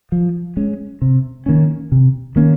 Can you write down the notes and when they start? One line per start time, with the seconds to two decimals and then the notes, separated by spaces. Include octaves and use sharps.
0.12 F3
0.57 G#3 C#4
1.02 C3
1.46 D#3 A#3 C#4
1.92 C3
2.36 D#3 A#3 C#4